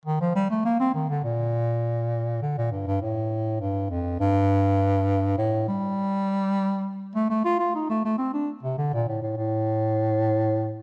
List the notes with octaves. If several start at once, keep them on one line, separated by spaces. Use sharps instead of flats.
D#3
F3
G3
A3
A#3
C4
D#3
D3
A#2
D3
A#2
G2
G2
A2
G2
F2
G2
A2
G3
A3
A3
F4
F4
D#4
A3
A3
C4
D4
C3
D3
A#2
A2
A2
A2